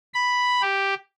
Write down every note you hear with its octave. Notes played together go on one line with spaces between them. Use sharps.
B5
G4